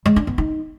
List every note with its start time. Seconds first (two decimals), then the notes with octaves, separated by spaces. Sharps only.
0.06 G#3
0.16 D4
0.27 B3
0.38 D#4